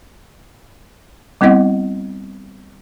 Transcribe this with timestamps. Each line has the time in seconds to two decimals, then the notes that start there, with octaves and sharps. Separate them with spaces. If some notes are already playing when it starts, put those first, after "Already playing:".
1.41 G3 B3 C4 E4 D#5 F#5